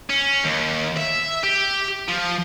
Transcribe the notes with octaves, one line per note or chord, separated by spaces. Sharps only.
C#4
D#2
E5
G4
F3